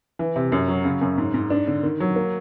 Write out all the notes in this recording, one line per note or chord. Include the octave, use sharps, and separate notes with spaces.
E3
C3
F#2
F#3
C#3
F#2
G#2
G#2
D4
D3
D#3
F#3
A#3